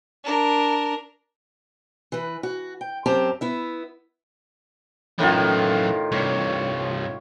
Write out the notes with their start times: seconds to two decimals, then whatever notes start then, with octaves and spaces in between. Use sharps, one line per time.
0.24 D4 A#4
2.12 E3 B4
2.43 F#4
2.81 G5
3.06 F#2 C4 G4 A5 A#5
3.41 B3 E4 E5
5.19 F#2 A2 D#3 E3 F4
6.12 G2 C3 C#5